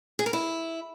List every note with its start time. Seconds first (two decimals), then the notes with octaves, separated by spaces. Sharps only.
0.19 G#4
0.26 A#4
0.33 E4